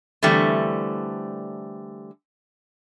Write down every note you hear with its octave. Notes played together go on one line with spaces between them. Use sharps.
D3 E3 G3 A3 C4